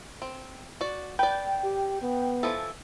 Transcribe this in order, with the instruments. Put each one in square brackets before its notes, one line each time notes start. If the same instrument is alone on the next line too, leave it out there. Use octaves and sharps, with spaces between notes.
[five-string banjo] C4
F#4 D5
[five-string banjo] B4 D5 [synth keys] G5
[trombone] G4
B3
[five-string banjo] E3 F3 A4